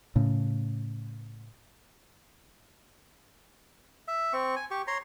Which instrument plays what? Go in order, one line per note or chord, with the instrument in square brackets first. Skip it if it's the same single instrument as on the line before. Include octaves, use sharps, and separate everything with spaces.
[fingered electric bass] A2 C#3
[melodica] E5
C4 C#6
G#5
G4 C#6
C#5 A#5 C6